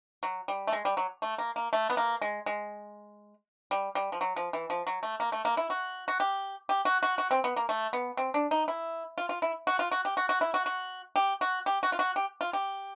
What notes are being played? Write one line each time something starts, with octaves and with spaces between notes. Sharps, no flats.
F#3
G3
A3
G#3
G3
F#3
A3
A#3
A#3
A3
B3
A#3
G#3
G#3
G3
G3
F3
F#3
F3
E3
F3
F#3
A3
A#3
A3
A#3
E4
F#4
F#4
G4
G4
F#4
F#4
F#4
C4
B3
A#3
A3
B3
C4
D4
D#4
E4
F4
F4
E4
F#4
F4
F#4
G4
F#4
F#4
E4
F#4
F#4
G4
F#4
G4
F#4
F4
F#4
G4
F4
G4